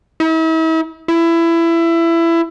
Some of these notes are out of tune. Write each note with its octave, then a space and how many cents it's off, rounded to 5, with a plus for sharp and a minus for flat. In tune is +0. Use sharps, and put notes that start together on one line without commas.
E4 -40
E4 +20